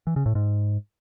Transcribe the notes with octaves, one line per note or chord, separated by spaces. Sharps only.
E3
C#3
A2
G#2